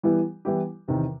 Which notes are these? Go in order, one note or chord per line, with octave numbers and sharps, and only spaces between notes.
E3 G3 B3 E4 G4
E3 G3 B3 E4 G4
E2 C3 D#3